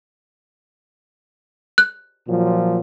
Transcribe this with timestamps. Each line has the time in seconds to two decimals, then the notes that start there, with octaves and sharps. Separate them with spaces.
1.78 F#6
2.27 A#2 F3 F#3